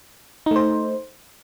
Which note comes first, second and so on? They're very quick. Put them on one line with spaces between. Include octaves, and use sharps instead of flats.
D#4 A3 C5